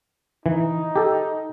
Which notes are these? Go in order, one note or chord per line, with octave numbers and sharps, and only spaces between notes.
E3 D#4
G4 A4